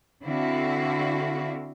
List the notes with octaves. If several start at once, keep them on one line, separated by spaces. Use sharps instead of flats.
D3 C4 E4 F#4 F5